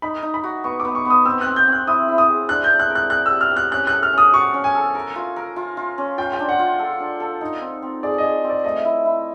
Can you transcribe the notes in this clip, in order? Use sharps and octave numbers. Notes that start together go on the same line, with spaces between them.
D#4 B5
D#4
B5
F#4
B3 C#6
D6
B3
C#6
B3
D#6
C4 E6
F#6
C4
G6
C4
F#6
E4 D#6
E4
D#6
G#4
D4 F#6
G6
D4
F#6
A#4
F#6
A#4 F#6
E6
G4
F6
G4 F#6
C#4 F#6
F#6
A4
F6
C#4 D#6
F#4 C#6
C#4
G#5
A4
A#4
F4
A#4
F4
F4
C#4
F4 G5
G5
D4
F#5
F4
A4
D4
A4
D#4
C4
C4
G#4 D5
D#5
G#4
C4
D5
A3 D#5
E4
E4